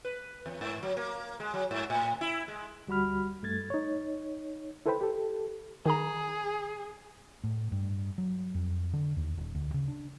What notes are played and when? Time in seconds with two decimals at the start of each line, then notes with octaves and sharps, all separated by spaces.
0.05 B4
0.46 E2
0.61 G#2
0.83 F#3
0.97 A#3
1.40 G#3
1.54 F#3
1.71 G#2
1.90 A2
2.21 E4
2.48 G#3
2.87 D2 G3 F#4 B5 F6
3.43 G2 A3 G#6 A6
3.70 D#4 C#5
4.86 E4 A4 B4 C5 G5 B5
5.01 G4 A4
5.86 D#3 G#4 A#5
7.44 A2
7.72 G2
8.18 F#3
8.55 F2
8.93 D3
9.16 D#2
9.37 D#1
9.55 D2
9.74 C#3
9.88 D4